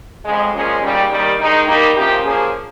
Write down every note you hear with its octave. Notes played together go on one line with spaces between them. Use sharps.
F2 C#3 G#3
A#2 F3 G#3 C#4 G#4
D#2 C#3 G3
D#2 D#3 G3
D#3 G#3 D#4 G#4
D#3 G3 A#3 D#4
C3 F3 A#3 C#4 G4
F3 A#3 C#4 G#4